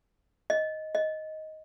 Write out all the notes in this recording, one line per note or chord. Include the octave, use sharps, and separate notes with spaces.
D#5
D#5